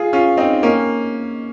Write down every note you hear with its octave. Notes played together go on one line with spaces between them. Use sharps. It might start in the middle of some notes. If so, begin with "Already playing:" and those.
Already playing: F4 G#4
C#4 F4
C4 D#4
A#3 C#4